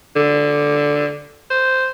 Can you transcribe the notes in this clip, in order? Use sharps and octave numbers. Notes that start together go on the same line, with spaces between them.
D3
C5